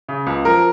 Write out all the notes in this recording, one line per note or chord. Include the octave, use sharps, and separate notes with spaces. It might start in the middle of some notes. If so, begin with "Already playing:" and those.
C#3
C#2
F3 A#4